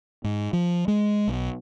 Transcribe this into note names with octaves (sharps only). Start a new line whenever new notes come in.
G#2
F3
G#3
B1